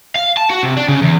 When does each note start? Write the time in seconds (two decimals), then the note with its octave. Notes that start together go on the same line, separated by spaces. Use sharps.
0.15 F5
0.37 A5
0.50 F#4
0.63 C3
0.77 D4
0.88 C#3
1.02 E2